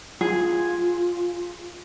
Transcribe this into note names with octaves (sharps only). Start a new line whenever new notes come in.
F4 G#4